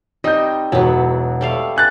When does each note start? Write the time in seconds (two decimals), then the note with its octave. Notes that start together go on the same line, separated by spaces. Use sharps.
0.24 G3 C4 D#4 D#5 G6
0.72 E1 F#3 B3 F#4
1.41 G3 A3 F5
1.76 G#5 F#6 A6